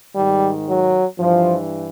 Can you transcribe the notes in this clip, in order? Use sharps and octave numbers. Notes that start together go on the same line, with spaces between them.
G#2 D#3 G3
F#3
G2 E3 F3